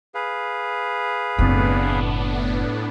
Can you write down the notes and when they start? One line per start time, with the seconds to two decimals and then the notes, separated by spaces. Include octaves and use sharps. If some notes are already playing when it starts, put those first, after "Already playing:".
0.15 G#4 B4 F5
1.38 F#1 A2 B3 C4 D4